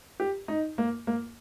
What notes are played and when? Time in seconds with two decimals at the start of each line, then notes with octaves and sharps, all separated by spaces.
0.20 G4
0.48 D#4
0.78 A#3
1.07 A#3